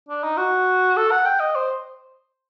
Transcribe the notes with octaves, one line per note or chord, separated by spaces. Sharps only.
D4
D#4
F#4
A4
F#5
G5
D#5
C5